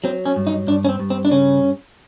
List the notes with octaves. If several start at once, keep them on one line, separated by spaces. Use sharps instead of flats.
F#3 C4
C#4
G2
D#4
G2 D4
C#4
C4
G2
C4
D4
C#3 C#4